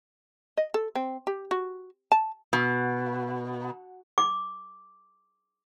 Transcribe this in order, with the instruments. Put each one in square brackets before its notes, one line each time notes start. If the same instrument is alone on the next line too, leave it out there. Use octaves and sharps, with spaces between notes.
[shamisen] D#5
A4
C4
G4
F#4
A5
[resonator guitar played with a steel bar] B2
[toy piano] D6